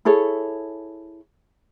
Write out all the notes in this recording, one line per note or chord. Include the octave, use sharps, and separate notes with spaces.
E4 G#4 A4 C#5